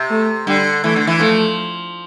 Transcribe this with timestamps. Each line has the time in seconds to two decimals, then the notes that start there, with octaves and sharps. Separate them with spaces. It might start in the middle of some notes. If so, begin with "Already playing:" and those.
Already playing: C3
0.10 A3
0.47 D3 G3
0.84 E3 A3
0.96 D3
1.07 E3
1.19 F3 A3